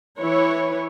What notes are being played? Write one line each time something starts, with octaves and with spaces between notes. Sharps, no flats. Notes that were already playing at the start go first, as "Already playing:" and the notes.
E3 E4 B4 C#5